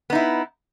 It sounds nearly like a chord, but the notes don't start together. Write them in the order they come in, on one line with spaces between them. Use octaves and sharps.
B3 D#4 E4